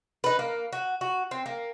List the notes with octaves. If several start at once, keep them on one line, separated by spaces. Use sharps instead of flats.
D#4 B4
A#3
F#4
F#4
C4
A#3